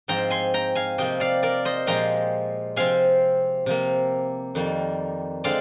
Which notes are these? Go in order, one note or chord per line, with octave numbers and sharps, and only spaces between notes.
G#2 F3 C4 G5 A#5
G#5 C6
G5 A#5
F5 G#5
C3 F3 A#3 D#5 G5
D5 F5
A#4 D5
C5 D#5
A#2 F3 G#3 G5 A#5
C3 F3 C4 F5 G#5
C3 F3 A#3
F2 D#3 G3 A#3
D3 G#3 C4 D5 F5